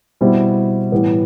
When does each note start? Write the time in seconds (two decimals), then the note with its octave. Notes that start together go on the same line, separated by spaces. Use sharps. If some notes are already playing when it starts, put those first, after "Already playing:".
0.21 B2 G3 C4 E4
0.92 A2 E3 G3 B3